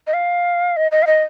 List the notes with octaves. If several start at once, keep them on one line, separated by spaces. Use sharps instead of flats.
D#5
F5
D#5
D#5
F5
D#5